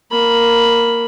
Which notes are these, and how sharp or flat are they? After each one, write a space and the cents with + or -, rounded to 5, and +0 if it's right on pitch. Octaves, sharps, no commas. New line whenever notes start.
A#3 +0 B5 +0